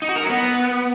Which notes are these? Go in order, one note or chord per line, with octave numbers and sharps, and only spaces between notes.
D#4
F#4
A#4
F#3
B3